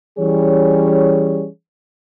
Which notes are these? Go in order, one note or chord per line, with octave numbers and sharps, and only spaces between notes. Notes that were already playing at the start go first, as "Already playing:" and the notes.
E3 G3 C#4 G#4 C#5